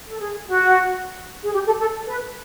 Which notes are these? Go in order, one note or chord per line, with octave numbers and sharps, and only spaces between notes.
A4
G#4
F#4
G#4
G4
A4
A4
B4